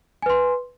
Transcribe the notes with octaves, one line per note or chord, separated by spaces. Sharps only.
B4 G#5 C6